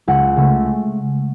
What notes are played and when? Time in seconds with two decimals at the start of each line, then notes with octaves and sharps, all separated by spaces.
0.08 C#2 F#5
0.36 C#3 A3